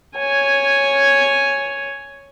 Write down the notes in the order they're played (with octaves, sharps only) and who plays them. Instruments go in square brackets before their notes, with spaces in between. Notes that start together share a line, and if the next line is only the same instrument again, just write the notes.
[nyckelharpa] C#5 G#5